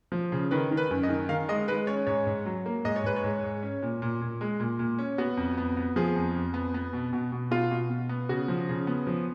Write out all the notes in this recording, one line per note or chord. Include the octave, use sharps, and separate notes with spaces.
F3
C#3
D#3 B4
D#3
B4
F#2
D#5
D#3
D#3 F5
G#3 D#5
G#3 B4
C#4 C#5
G#2 C#5
G#2
F#3
A#3
G#2 D#5
C#5
G#2 B4
C#5
G#2
G#2
C#4
A#2
A#2
A#2
G#3
A#2
A#2
C#4
B3 F#4
F2
B3
B3
F3 G#4
F2
F2
B3
B3
B2
B2
B2
B2 F4
B2
B2
B3
C#3 F#4
F3
C#3
B3
F3